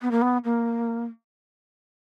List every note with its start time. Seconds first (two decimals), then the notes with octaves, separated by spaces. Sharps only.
0.02 B3
0.11 A#3
0.22 B3
0.45 A#3